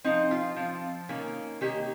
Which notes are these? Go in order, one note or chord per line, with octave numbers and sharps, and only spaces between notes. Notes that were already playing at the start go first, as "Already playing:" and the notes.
F3 C4 D#4
F4
F3 C4
D#3 A#3 C#4
D#3 A#3 C#4 G4